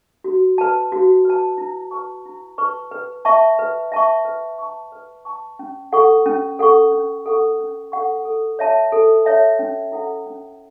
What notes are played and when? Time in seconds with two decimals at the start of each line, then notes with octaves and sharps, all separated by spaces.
0.24 F#4
0.58 B4 A5
0.92 F#4
1.25 B4 A5
1.58 E4
1.91 B4 A5 C#6
2.26 E4
2.58 B4 A5 C#6
2.91 B4
3.25 E5 A5 C#6
3.59 B4
3.92 E5 A5 C#6
4.25 B4
4.58 A5 C#6
4.92 B4
5.25 A5 C#6
5.59 C#4
5.93 A4 F#5 C#6
6.26 C#4
6.59 A4 F#5 C#6
6.92 C#4
7.26 A4 F#5 C#6
7.60 C#4
7.92 A4 F#5 C#6
8.25 A4
8.59 C#5 E5 A5
8.92 A4
9.25 C#5 E5 A5
9.59 C#4
9.92 E4 A4 F#5
10.26 C#4